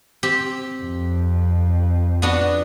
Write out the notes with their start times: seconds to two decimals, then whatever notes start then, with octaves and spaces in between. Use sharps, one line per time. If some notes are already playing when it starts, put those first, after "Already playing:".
0.23 C4 G4
0.83 F2
2.22 B3 D4 F#4